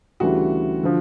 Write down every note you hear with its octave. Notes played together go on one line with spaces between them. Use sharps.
D2 C#3 E3 G3 F#4
D3 F3